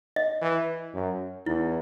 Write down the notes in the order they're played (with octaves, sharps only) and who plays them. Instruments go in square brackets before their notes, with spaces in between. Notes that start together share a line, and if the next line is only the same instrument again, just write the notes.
[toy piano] D#5
[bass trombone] E3
F#2
[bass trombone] E2 [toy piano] E4